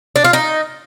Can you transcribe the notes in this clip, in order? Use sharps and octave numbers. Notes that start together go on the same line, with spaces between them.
D4
F4
D#4